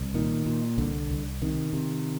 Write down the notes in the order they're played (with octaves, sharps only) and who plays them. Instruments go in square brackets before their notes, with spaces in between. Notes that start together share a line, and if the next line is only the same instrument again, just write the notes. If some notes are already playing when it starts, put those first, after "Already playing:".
Already playing: [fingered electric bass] C2
A#2 D#3
A#2
C2 D3
C2
C3 D#3
C3